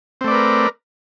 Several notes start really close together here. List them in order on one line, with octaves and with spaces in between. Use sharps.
C4 A3 D5 B4 A#4